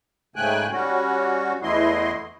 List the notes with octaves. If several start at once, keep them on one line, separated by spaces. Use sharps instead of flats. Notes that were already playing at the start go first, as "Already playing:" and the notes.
G#2 C#3 A3 G5 G#5 F#6
G3 C#4 F#4
E2 E3 A3 E4 D#5 C6